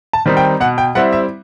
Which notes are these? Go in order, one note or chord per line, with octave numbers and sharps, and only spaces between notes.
A5
D#3 G3 C4 D#4
G5
B2 F#5
G5
G3 C4 E4 F#5
E5